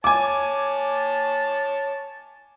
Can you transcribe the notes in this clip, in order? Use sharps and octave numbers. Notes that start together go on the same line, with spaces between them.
C#5 G#5 A5 D6